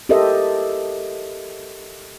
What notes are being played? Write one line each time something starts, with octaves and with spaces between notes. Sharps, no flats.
G4 A4 A#4 C5 D#5 E5